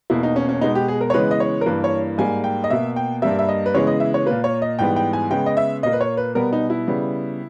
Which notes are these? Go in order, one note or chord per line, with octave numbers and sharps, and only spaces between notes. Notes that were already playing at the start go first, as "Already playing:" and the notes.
E2 B2 A#3 E4
D#4
C#4
C#4
B2 G#3 B3 D#4
G4
G#4
A#4
C#5
C#3 E3 G#3 B3 B4
D#5
C#5
A#4
G2 E3 A#3 B4
C#5
G#2 G3 A#3 G#5
G5
D#5
B2 A#3 E5
G5
G2 G3 A#3 E5
E5
D#5
B4
C#3 E3 G#3 B3 C#5
D#5
E5
C#5
A#2 A#3 B4
C#5
D#5
G#2 E3 G3 B3 G5
G5
G#5
C#3 G#3 B3 G5
D#5
E5
A#2 A#3 D#5
B4
C#5
B4
B2 G3 B3 A#4
D#4
E4
C#3 G3 B3